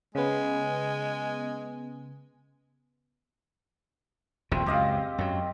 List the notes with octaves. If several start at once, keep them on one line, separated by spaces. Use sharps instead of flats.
C#3 G#3 B3
D#1 A#1 D3 C4
C#2 F#2 G4 D#5 F5
F#2 F#3